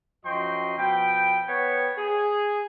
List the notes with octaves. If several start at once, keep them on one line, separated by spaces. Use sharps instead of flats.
F#2 F3 F#4 D#5 G5 C6
B2 F3 B4 G5
B3 C#5 G5
G#4